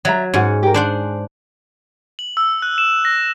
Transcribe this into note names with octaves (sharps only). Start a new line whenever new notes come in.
F#3 D5 E5 A#5
G#2 C#4 F#4 F#5
G4 A#4
D4 G#4 C5 F#5
F#7
E6
F#6
E7
A#6